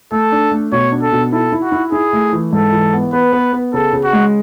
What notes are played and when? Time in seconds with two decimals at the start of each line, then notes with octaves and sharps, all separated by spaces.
0.12 A3 A4
0.32 D4
0.51 A3
0.72 B2 C#5
0.92 D4
1.02 A4
1.12 B2
1.32 E4 A4
1.52 E4
1.62 F#4
1.72 E4
1.92 E4 G#4
2.13 A3
2.33 E3
2.53 G#2 A4
2.72 E3
2.93 B3
3.13 B3 B4
3.33 B3
3.53 B3
3.73 C#3 A4
3.93 C#3
4.04 F#4
4.13 G#3